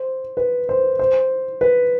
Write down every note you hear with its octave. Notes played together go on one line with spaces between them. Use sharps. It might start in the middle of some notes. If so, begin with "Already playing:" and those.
Already playing: C5
B4
C5
C5
B4